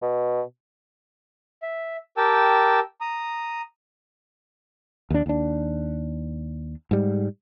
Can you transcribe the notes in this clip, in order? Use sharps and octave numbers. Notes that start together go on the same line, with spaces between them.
B2
E5
G4 A#4 G5 A5 E6
A#5 D#6
D#2 D4
D#2 D4
G#2 G3